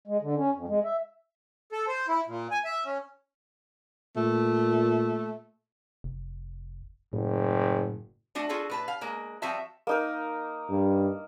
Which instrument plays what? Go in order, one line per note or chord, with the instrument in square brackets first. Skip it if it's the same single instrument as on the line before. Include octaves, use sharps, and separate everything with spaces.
[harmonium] G#3
D3
C#4
F2
G#3
E5
[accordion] A4
C5
E4
A#2
G#5
E5
C#4
[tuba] A#2 [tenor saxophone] A3
[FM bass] F1
[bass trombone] F#1 [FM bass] A2
[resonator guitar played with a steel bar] A3 D4 F#4
F4 F#4 G#4 A4
A2 B4 A5
F5
G#3 A#3
F3 G3 C4 F#4 E5 A5
[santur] A#3 D#4 A#4
[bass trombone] G2